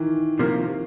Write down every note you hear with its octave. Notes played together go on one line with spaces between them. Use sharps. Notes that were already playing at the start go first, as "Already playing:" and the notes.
Already playing: D#3 E3
C3 F3 A#3